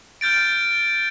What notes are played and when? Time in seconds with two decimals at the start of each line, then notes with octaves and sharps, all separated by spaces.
0.21 F6 G6 A6 D7